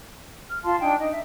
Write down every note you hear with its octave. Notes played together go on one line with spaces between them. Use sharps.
F6
F4 F5 A5 C6
D4 D#4 G5 G#5
D#4 D#5
E5